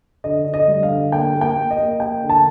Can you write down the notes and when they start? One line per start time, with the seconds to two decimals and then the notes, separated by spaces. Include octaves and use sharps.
0.24 D3 D#5
0.46 D3
0.54 D#5
0.68 G3
0.83 F5
0.90 D3
1.12 A#3 G5
1.35 A#3
1.41 G5
1.56 A#3
1.71 D#5
1.78 A#3
2.00 A#3 G5
2.22 D3
2.29 A5